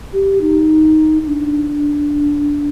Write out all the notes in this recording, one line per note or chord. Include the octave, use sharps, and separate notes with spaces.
G4
D#4
D4